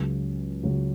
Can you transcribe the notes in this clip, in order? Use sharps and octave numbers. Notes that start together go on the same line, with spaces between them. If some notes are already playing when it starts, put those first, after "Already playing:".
Already playing: C#2 C#3 F#3
C#2 C#3 F#3